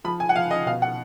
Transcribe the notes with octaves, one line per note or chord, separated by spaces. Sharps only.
F3 B5
G#5
F#5
F3 F5
D#5
B2 F5
F#5